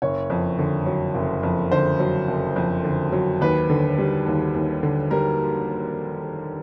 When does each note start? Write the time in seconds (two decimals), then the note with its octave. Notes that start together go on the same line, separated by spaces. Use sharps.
0.02 F#1 C#5
0.30 F2
0.59 D3
0.87 F#3
1.15 F#1
1.43 F2
1.71 D3 C5
2.00 F#3
2.28 F#1
2.56 F2
2.85 D3
3.12 F#3
3.41 D#2 B4
3.70 D3
3.98 G3
4.26 D#2
4.54 D#2
4.83 D3
5.11 G3 A#4